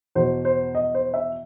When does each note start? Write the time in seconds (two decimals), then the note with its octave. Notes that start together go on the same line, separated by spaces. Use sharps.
0.15 E2 B2 C5
0.45 C5
0.75 D#5
0.95 C5
1.14 E5